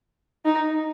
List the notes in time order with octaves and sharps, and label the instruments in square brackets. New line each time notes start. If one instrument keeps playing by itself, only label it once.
[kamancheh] D#4